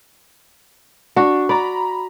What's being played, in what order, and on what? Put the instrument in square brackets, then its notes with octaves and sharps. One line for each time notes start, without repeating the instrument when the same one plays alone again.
[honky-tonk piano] D4 [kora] F#4
[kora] D5 [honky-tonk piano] A#5 B5